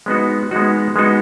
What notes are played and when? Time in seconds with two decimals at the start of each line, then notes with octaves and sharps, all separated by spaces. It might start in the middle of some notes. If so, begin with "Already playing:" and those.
0.06 G#3 B3 D#4 F#4
0.51 G#3 B3 D#4 F#4
0.96 G#3 B3 D#4 F#4